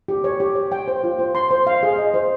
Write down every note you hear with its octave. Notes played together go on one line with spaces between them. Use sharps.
G4
C#5
G4
C#5
G5
C5
F4
C5
C6
C5
F5
G#4
D#5
C5